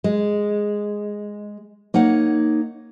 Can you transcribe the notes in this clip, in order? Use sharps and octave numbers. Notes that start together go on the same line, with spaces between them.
G#3
A#3 D#4 C#5 F#5